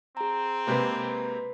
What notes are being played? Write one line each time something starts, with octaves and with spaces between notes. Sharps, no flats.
C4 G#4 A#5
C3 G#3 A#3 B4 C5